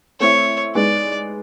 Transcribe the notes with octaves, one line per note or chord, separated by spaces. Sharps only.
A3 C4 E4 C#5
G#3 B3 D#4 G#4 D5